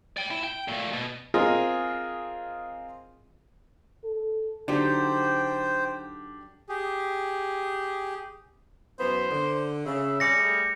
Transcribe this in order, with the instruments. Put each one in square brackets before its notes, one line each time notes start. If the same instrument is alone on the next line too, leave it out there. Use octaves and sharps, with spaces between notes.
[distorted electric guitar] D5 G5
E4
G5
A#2 A3
B2
[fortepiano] C4 F4 G#4 A#4 D#5 G#5
[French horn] A4
[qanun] D3 F#3 D#4 [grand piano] D4 G4 [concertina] C5 G5
[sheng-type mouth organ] G4 G#4
[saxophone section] F#2 E3 B3 [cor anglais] C5
[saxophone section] D3
[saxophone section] C#3 [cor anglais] E5
[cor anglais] G3 [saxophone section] C4 C#4 D5 [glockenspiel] A#6 C#7
[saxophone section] A3 G#4